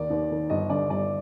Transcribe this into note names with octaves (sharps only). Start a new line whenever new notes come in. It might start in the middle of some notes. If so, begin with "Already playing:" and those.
Already playing: D#2 D#3 D5
D#2
D#3
G1 D#5
G2 D3 D5
G1 D5